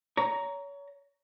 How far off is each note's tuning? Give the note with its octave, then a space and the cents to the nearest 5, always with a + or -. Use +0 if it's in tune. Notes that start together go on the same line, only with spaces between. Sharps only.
C#5 +30 A#5 +0